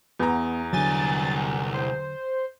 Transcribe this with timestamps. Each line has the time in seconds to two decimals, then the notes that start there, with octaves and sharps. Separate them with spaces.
0.19 E2 B3 A#5
0.73 C2 D3 F#3 G#5 A6
1.74 C5